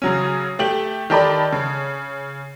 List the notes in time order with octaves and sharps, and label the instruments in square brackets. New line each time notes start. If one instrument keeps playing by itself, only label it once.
[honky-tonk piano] C#3 F#3 C#4
A3 G4 F#7
D#3 G4 A4 D5 B5
C#3